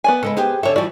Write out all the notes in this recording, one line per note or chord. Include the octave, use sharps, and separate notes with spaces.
B3 D5 G#5
C#3 G#3 A4 B4
B3 G4 G#4 C5
D3 A4 C#5 E5
E3 F3 G3 F#4 D5